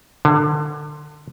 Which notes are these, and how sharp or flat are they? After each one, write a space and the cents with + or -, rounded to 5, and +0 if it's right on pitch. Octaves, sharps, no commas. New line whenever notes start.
D3 +25